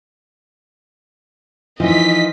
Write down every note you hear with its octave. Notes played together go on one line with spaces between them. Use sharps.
E3 F3 D#4 D#5 B6